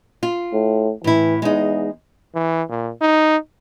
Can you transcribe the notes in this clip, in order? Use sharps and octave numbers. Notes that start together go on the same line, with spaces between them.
F4
A2
A2 E3 E4
E2 G#3 D#4
E3
A#2
D#4